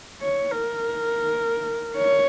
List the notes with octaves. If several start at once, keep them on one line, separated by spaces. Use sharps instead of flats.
C#5
A#4
C#5